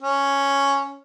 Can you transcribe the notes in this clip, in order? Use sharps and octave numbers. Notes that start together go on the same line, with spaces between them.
C#4